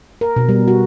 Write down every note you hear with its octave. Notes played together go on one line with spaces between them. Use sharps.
A#4
B2
G3
F#4